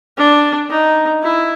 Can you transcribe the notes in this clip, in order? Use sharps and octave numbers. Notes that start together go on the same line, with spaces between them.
D4
D#4
E4